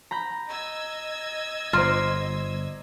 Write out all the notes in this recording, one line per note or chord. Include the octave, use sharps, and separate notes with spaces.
A#5 B5 G6
D#5 E6 G#6
G1 F4 C5 D5 A#5